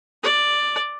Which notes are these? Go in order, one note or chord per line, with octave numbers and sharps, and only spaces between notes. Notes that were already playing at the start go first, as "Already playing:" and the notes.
D5